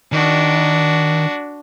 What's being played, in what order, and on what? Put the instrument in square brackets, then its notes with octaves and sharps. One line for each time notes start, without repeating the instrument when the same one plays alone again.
[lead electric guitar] D#3 [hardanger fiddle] D4 F#4